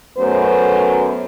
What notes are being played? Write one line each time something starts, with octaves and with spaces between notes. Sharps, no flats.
F#2 A3 B3 B4 C5